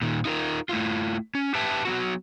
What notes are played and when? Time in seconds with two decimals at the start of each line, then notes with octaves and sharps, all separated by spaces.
0.02 A#2 D#3
0.25 D#4 F4 A4 A#4
0.69 A3 E4 F4
1.35 C#4
1.55 G4 B4 E5 G5 A5
1.85 F#3 B3 F#4